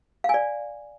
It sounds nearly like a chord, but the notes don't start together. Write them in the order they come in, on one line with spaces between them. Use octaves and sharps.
F5 G#5 D5